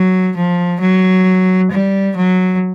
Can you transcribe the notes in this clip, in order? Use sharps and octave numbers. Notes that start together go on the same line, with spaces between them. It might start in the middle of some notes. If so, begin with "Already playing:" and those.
Already playing: F#3
F3
F#3
G3
F#3